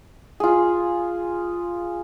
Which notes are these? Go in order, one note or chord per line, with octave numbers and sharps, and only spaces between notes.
F4 G#4